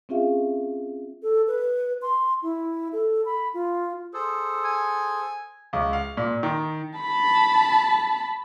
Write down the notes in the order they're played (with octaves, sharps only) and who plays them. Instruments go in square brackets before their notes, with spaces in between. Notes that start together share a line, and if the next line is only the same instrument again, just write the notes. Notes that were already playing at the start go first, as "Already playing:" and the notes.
[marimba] C4 C#4 F4 G#4 E5 F5
[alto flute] A4
B4
C6
E4
A4
B5
F4
[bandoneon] G#4 A4 C5
[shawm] G#5
[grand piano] C#2
F5
A#2
D#3
[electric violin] A5 B5